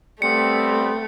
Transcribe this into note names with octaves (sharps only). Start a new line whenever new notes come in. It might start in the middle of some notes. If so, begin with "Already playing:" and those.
G3 A3 B3 C4 C#7